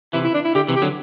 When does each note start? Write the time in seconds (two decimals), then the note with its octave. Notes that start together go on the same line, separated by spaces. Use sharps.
0.13 C3 E3 E4
0.24 E4
0.34 D4
0.45 E4
0.55 D3 G4
0.68 C3 E3
0.76 G4
0.82 D3 F#3